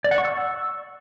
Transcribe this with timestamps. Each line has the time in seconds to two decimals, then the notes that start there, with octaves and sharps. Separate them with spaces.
0.04 D5
0.11 F#5
0.18 C#6
0.25 E6